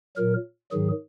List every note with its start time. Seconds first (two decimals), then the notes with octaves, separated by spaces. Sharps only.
0.16 A#2 F#3 A#4
0.71 G#2 D#3 F#3 G#4